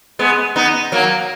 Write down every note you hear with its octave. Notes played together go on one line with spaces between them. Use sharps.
G#3 B3
B3 D#4
F#3 A#3